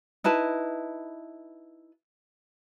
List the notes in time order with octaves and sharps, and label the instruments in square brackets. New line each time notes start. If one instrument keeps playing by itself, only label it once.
[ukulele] D#4 E4 B4 A5